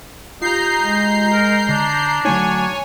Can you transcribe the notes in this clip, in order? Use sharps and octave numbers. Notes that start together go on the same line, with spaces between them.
D#4 F4 G4 A#5 G6 C7
G#3
A#4
D3 D4
D3 F#3 A3 D#4 C#5 G#5